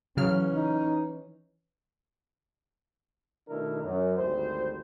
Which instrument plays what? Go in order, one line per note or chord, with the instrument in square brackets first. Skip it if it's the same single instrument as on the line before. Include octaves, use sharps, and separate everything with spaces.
[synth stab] C#3 F#3 F6 [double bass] E3 C#4
[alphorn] D#4
[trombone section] B2 D#3 A3 D4 E4 A#4
F#2
G#1 D2 G3 C5